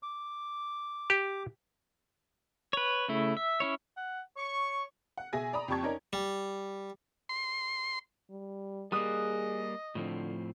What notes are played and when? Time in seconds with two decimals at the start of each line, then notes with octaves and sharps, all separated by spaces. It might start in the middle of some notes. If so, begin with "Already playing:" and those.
0.03 D6
1.10 G4
2.73 B4 C#5
3.09 C#3 A3 E4
3.37 E5
3.60 C#4 E4 C#5
3.97 F#5
4.36 C#5 C#6
5.17 F#5
5.33 B2 G#4 E5 G#5 A#6
5.53 D5 A#5 B5 D#6
5.68 F2 G4 G5 A5 C#6 G#6
5.83 C#4 D#4 A#4 D5
6.13 G3
7.29 C6
8.30 G3
8.92 G3 A#3 G#4 D#5 D#6 F#6 E7
9.95 A2 D3 F3 C4